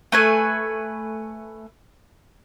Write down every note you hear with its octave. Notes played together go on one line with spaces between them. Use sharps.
A3 B4 G#5